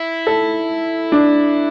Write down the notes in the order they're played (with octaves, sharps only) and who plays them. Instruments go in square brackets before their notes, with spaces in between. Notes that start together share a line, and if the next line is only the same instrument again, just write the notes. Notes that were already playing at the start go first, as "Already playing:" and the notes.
Already playing: [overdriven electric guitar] E4
[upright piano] A4
D4